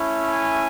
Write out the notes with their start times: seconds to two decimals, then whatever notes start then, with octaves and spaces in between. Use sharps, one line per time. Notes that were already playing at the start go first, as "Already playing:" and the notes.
Already playing: A3 C#4 E4
0.27 G#5